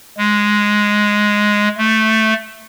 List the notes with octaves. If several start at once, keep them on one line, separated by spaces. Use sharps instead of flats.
G#3
A3